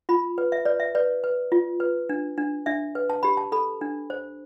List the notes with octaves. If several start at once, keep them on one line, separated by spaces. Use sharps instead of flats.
F4 B5
B4
E5
B4 D5
E5
B4 D5
B4
F4
B4
D4
D4
D4 E5
B4
A5
G4 B5
A5
A4 B5
D4
C5